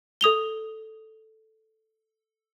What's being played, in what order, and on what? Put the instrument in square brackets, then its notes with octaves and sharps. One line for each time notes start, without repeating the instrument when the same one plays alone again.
[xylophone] A4 D#6 F7 G7